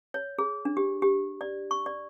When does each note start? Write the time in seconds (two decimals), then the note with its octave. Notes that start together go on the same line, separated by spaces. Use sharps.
0.14 C#5
0.38 G#4
0.65 D4
0.77 G4
1.02 G4
1.41 D5
1.71 C#6
1.86 D5